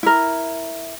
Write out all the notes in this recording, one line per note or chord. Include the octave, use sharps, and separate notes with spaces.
E4 A#4